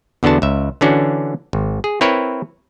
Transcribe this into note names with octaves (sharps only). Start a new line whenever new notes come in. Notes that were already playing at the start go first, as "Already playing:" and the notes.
E2 D3 B3 D4 F#4 A5
C#2 E5
D3 E3 C#4 D4 F#4
G#1
G#4
C4 E4 A#4 B4 C#5